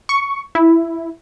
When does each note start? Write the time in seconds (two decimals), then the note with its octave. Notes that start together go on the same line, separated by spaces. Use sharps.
0.09 C#6
0.55 E4